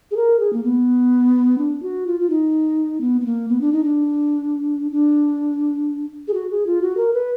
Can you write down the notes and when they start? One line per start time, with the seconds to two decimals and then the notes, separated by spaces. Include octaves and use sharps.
0.11 G#4
0.16 A#4
0.39 G#4
0.53 A#3
0.63 B3
1.58 D4
1.82 F#4
2.07 F4
2.20 F4
2.30 D#4
3.01 B3
3.21 B3
3.25 A#3
3.48 B3
3.61 D4
3.72 D#4
3.84 D4
4.91 D4
6.28 G#4
6.34 F#4
6.51 G#4
6.66 F4
6.82 F#4
6.97 A#4
7.13 B4